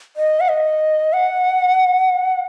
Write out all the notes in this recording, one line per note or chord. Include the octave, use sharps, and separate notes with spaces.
D#5
F#5
D#5
F#5